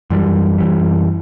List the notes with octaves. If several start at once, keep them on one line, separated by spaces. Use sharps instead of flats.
F#2 E3 G3
F#2 E3 G3